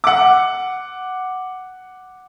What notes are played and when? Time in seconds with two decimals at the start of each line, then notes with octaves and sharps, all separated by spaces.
0.04 F#5 D6